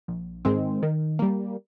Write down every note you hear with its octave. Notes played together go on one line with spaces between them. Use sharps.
A#1
G#2 D#3 G#3 C4
D#3
G3 A#3